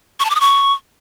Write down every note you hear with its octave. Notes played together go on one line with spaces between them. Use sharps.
C#6
A5
D6
D#6
C#6